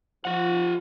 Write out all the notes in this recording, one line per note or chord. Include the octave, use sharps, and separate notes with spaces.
F3 F4 F#5